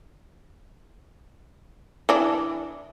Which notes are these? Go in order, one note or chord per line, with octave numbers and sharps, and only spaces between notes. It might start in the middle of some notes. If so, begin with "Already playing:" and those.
E3 D4